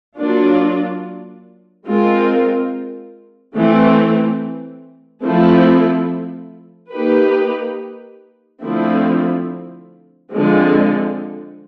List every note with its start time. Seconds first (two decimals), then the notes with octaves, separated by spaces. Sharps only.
0.17 F#3 A#3 D4 F4
1.86 G#3 C4 F4 A#4
3.55 E3 A3 C4
5.24 F3 A3 C4 E4 A4
6.93 A#3 D#4 G4 B4
8.62 D3 F3 A3 C4 E4
10.31 D3 F3 G#3 C4